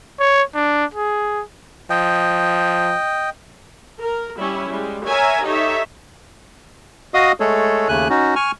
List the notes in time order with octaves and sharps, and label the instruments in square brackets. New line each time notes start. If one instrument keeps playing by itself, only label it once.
[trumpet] C#5
D4
G#4
[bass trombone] F3 [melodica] D#5 G5
[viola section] A#4
G3 C#4 E4
G3 G#3
A#4 C#5 E5 G#5 A#5
D#4 G4 A4 C#5 E5
[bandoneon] F#4 D#5 F5 D#6
G#3 A3 G#4 A4 C#5
D#2 C#3 A3 G#5 F#6
C#4 D#4 F#4
G#5 C#6 F6